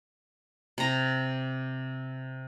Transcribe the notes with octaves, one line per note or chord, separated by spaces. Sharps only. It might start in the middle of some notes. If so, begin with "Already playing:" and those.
C3 A#5